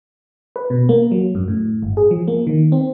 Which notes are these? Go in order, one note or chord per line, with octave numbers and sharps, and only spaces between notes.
B4
B2
A#3
F#3
F#2
A2
G1
G#4
F3
A#3
D#3
C4